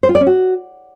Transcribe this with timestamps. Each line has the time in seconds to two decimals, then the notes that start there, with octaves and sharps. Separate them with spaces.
0.03 C5
0.09 F4
0.15 D5
0.21 C#4
0.27 F#4